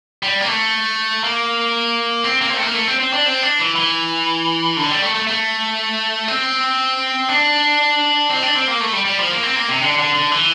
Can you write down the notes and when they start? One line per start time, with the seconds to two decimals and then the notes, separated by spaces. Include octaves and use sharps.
0.23 G3
0.41 A#3
0.48 A3
1.24 A#3
2.24 C4
2.41 A#3
2.50 C4
2.57 A3
2.62 A#3
2.75 A3
2.87 C4
3.00 C4
3.13 D4
3.26 C4
3.42 D4
3.59 E3
3.76 E3
4.77 D3
4.89 G3
5.02 A3
5.14 A3
5.27 A3
6.28 C4
7.29 D4
8.30 C4
8.43 D4
8.55 C4
8.68 A#3
8.80 A3
8.93 G3
9.05 G3
9.18 F3
9.31 A#3
9.43 C4
9.56 A#3
9.69 C3
9.81 D3
9.98 D3
10.15 D3
10.32 E3